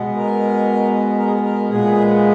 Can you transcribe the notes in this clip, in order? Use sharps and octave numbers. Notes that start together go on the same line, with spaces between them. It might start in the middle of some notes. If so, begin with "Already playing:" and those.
Already playing: B2 G#3 B3
A#4
A#4
G#4
A#4
A#4
A#2 G#3 B3 G#4